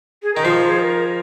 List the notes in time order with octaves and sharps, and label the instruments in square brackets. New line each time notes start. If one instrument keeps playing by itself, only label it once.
[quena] G#4
[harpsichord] D#3 [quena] A#4
[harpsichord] F3 [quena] C5
[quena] G#4
A#4